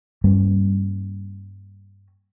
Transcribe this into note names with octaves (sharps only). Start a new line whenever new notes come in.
G2 G3 A#3 C#4